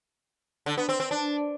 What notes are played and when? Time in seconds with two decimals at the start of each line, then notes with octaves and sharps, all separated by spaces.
0.66 D3
0.77 B3
0.89 C4
1.00 C4
1.11 D4